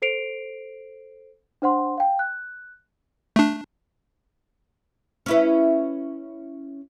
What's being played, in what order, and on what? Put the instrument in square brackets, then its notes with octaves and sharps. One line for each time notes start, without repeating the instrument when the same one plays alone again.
[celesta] A4 C5 C7 D7 F7
D4 C5 F#5 C6
F5 G5
F#6
[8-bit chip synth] A3 D4
[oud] C#4 E4 B4